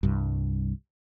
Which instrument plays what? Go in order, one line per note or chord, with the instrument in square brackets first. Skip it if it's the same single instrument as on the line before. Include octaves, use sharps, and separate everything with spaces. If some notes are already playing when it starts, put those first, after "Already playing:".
[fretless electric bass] C2 G2